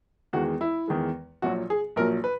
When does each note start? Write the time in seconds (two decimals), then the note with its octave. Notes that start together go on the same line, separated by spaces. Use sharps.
0.33 E2 D#3 G#3 F#4
0.61 E4
0.88 E2 D#3 G#3
1.42 A#1 A#2 F#3 F#4
1.70 G#4
1.96 A#1 A#2 F#3 A#4
2.24 B4